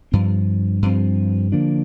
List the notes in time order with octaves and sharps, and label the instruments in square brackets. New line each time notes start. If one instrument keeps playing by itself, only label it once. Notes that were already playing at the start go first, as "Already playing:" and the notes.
[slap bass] G2 F3 C4
G2 F3 C4
D3 F3 A#3 D4